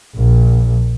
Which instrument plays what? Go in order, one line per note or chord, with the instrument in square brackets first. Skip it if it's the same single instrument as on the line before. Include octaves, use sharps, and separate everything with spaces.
[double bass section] A#1